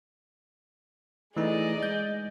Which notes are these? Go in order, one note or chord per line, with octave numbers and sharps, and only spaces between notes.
E3 A3 D#4 G#4 D5 D#5
G#3 G6